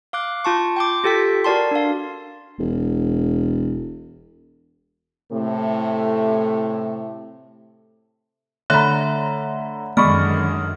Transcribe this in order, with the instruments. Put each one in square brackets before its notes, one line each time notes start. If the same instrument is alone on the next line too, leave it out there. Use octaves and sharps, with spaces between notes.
[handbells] F5 D6 F#6
F4 A5 C#6
G5 C6 D6
F4 G4 A4 G5 B6
F#4 A#4 D5 A5 C6
D4 F5
[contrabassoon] E1
[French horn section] A2 C3 A3
[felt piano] D3 A#5 [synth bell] A3 C#5 E5 [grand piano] B5 F#6
[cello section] F#2 D3 D#3 [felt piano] G#3 [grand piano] D5 B5 C#6 [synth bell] F6